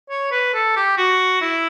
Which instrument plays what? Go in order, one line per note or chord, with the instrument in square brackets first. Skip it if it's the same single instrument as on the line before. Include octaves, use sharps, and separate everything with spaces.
[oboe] C#5
B4
A4
G4
F#4
E4